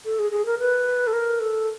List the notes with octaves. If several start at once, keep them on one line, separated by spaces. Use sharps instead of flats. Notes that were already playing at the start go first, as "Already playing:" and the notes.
A4
G#4
G#4
A#4
B4
A4
A#4
A4